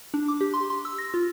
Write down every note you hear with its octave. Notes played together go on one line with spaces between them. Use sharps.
D4
D6
G4
C6
C6
E6
A#6
F4